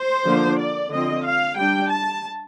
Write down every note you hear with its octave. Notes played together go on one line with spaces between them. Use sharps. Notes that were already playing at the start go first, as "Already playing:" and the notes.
Already playing: C5
D3 F3 A#3 D4
D5
D3 F3 C4 D#5
F5
G3 D4 G5
A5